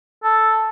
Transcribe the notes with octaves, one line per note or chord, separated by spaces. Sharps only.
A4